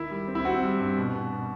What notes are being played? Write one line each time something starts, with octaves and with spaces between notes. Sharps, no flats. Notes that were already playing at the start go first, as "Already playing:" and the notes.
Already playing: D#3 E4
G3
C4
E4
C4 F#4
G3
G2
B2
B2
B2